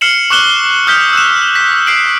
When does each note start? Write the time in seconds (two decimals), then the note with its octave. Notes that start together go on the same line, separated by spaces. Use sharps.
0.01 F6 C7 C#7 E7 F#7
0.30 C#6 D6 F#6 E7 G7
0.87 D#6 F6 G6 B6 G7
1.13 E6 F#6 E7
1.56 B6
1.86 G6 C7 D7 F#7